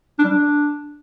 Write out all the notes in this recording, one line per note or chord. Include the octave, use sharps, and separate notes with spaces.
D4
G3
D4